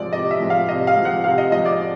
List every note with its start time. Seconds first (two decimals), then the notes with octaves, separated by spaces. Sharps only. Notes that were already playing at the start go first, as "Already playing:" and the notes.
Already playing: C3 F3 G#3 D5
0.13 C3 D#5
0.31 E5
0.40 F3 G#3
0.50 F5
0.69 C3 D#5
0.87 F5
0.96 F3 G#3
1.05 F#5
1.24 C3 F5
1.38 D#5
1.52 F3 G#3 D#5
1.66 D5